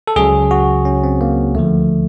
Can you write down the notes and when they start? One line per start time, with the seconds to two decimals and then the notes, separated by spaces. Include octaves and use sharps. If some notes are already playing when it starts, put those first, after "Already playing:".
0.07 A4
0.16 C#2 C#3 F#3 G#4
0.51 F#4
0.85 C#4
1.04 C4
1.21 A#3
1.54 D2 D3 F3 A3